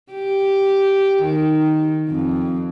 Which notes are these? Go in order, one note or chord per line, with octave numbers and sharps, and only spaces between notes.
G4
D#3
F2